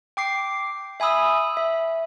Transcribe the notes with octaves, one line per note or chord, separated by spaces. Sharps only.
G5 D6 C7
E5 G#5 B5 D#6 E6
E5